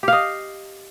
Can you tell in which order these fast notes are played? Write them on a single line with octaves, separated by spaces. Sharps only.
G4 F5 D#5